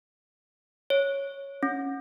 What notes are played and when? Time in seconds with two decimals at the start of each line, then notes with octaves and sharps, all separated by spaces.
0.90 C#5
1.63 C#4